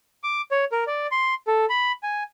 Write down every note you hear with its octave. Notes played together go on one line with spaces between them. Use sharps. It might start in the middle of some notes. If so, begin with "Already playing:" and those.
D6
C#5
A#4
D5
C6
A4
B5
G#5